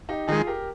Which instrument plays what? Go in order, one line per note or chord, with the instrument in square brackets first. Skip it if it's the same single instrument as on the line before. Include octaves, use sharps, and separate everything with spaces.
[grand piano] D#4 G4
[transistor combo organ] D#3 G#3 [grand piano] F4 G#4
[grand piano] G4 A#4